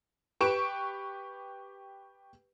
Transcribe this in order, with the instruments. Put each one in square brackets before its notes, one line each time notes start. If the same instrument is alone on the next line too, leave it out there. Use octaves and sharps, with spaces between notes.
[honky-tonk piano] G4 B4 C#6 D7 E7